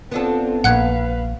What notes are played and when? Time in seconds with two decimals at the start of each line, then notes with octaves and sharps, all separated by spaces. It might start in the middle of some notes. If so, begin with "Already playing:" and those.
0.12 B3 C4 D4 F4 A4
0.64 A#1 A#2 B4 F5 F#5 F#6 G#6